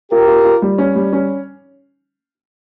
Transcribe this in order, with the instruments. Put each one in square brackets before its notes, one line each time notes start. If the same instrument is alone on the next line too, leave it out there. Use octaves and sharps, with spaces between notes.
[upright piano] F4 [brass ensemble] G4 A#4
[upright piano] F4
F4
G3
C#4
G3
C#4